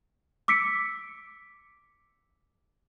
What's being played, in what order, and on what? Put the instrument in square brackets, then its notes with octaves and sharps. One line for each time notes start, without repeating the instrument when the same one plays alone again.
[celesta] D6 E6 B6 C#7 D7